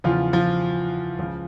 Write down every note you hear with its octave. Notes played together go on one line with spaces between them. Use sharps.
E2 C#3 F3 F4
F3 F4
C#2 C#3 F3